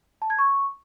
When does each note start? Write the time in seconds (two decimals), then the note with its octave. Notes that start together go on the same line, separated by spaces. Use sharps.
0.22 A5
0.30 G#6
0.39 C#6